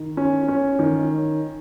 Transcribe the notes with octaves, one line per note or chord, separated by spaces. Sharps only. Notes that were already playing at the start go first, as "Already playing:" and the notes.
Already playing: D#3
C#4
C#4
D#3